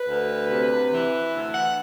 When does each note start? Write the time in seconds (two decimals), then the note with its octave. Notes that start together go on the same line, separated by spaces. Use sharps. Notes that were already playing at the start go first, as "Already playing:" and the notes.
Already playing: B4
0.08 D2
0.51 C3
0.92 E3
1.34 D2
1.54 F#5